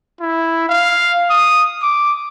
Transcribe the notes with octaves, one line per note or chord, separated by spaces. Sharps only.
E4
F5
D#6
D6